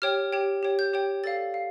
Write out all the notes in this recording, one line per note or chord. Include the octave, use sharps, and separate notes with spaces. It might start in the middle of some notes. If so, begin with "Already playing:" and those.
G4 C#5 G5 F6
G4 C#5 G5
G4 C#5 G5
G6
G4 C#5 G5
A4 D5 F5 A6
F5